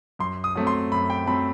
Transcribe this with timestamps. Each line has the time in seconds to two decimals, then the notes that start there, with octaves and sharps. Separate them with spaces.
0.19 F#2 C6
0.44 D#6
0.55 F#3 A3 C4
0.67 C6
0.92 F#2 B5
1.10 G5
1.26 F#3 A3 C4 B5